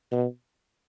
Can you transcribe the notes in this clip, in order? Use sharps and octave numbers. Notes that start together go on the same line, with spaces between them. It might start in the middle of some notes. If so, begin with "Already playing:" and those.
B2